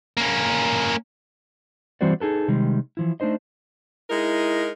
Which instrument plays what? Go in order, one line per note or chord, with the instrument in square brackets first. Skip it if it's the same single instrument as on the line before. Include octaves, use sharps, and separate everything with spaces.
[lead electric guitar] A#3 C#4
[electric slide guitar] E3 G3 C4 F#4 C5 D5
D#4 G#4 A4 B4
C3 D#3 G3 G#3
E3 F3 E4
A3 D4 D#4 C5 D#5
[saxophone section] G#3 D#4 A#4 [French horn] E4